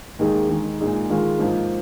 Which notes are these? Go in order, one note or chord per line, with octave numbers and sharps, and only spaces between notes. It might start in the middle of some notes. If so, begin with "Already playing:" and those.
D#2 D#3 G#3 D#4 G#4
D#3 G#3 D#4 G#4
A#2 G#3 D#4 G#4
D#3 G#3 F4
G#2 F3 A#3